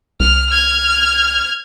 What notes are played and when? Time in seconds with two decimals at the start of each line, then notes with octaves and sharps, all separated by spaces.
0.20 C2 F6
0.50 F6 G#6